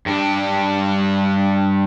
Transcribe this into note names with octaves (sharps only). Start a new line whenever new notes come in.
G2 D4